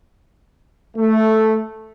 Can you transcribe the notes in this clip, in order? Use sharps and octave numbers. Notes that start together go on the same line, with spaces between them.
A3